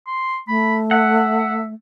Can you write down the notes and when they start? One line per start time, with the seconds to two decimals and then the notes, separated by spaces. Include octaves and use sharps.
0.07 C6
0.48 A3 B5
0.91 E5 F#5